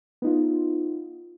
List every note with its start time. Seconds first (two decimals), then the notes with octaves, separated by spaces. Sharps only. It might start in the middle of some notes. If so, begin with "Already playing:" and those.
0.22 B3 D#4 F4